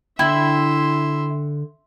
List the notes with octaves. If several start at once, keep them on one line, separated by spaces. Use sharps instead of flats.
D3 E4 E5 G5 C6